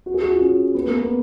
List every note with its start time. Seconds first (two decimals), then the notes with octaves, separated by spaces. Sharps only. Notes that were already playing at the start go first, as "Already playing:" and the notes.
0.06 F#4
0.14 G#4
0.24 F#4
0.32 F4
0.40 C#4
0.74 B3
0.88 A#3
1.01 B3